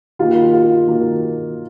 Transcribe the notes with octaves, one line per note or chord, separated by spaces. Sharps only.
D#3 A#3 F4
F4
D#3 A#3